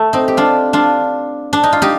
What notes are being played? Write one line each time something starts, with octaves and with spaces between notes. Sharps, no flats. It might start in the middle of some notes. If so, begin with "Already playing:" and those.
Already playing: A3
C4 D#4
G4
D4 F4
D4 F4
D4
D#4
F4
D#4 G4